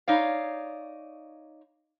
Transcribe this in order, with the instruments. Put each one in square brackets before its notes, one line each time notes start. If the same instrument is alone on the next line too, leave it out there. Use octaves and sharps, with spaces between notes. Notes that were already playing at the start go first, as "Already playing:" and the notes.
[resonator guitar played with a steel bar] D#4 C#5 D5 F5